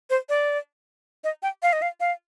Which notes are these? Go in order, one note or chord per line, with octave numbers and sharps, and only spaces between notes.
C5
D5
D#5
G5
F5
D#5
F5
F5